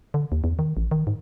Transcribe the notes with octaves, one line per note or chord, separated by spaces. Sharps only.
D3
D#2
E2
D#3
A1
D#3
G#2